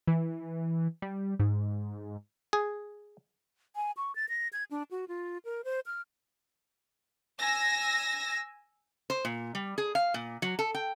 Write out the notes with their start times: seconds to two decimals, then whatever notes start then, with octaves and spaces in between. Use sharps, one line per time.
0.07 E3
1.02 G3
1.40 G#2
2.53 G#4
3.76 G#5
3.97 C#6
4.15 A6
4.29 A#6
4.53 G#6
4.71 D4
4.91 F#4
5.08 F4
5.45 A#4
5.64 C5
5.86 F6
7.40 G#5 E6 A#6
9.10 C5
9.25 A#2
9.55 G3
9.78 G#4
9.95 F5
10.14 A#2
10.42 F#3
10.59 A4
10.75 G5